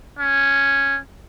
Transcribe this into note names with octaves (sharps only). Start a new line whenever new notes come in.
C#4